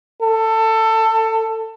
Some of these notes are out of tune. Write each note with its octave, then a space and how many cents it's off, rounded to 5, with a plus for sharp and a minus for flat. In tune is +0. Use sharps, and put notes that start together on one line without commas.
A4 +20